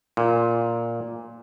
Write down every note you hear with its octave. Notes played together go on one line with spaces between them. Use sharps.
A#2